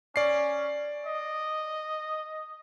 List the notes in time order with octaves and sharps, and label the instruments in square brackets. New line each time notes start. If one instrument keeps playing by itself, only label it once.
[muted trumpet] C#4 [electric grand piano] D5 C7
[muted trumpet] D#5